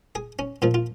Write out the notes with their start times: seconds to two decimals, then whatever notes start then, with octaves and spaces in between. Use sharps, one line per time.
0.15 G#4
0.39 C#4
0.62 A#2 F3 F4
0.74 F4